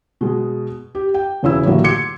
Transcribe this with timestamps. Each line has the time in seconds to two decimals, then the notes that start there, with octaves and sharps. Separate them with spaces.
0.21 B2 G#3
0.95 G4
1.14 G5
1.43 E1 C#3 E4 E6
1.65 A2 D3 E3 F#3 A#3
1.84 C6 D6 G#6 C#7